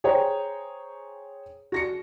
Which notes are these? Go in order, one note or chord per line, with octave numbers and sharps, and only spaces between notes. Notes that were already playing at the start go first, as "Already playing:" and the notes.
G#4 C5 C#5 G5 A#5
F#4 A#6 C#7